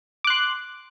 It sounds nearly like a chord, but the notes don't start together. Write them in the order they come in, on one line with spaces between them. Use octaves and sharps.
D6 F#6 C6